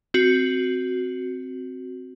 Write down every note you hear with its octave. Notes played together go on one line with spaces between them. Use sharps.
C4 F#4